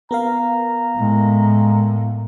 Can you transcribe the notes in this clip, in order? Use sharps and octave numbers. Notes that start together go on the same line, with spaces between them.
B3 A#4 F5 A#5
A2 G#3